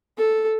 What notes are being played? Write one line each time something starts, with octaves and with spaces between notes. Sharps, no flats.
A4